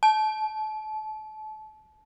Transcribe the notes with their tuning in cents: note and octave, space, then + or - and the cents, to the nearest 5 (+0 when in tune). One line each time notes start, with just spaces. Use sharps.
A5 -30